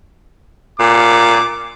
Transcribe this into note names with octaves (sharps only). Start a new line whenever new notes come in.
A#2 D6